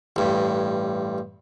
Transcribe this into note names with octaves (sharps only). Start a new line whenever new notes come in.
A1 G2